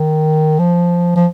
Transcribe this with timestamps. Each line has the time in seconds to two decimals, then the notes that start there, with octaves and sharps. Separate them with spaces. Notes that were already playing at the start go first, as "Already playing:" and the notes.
Already playing: D#3
0.59 F3
1.16 F3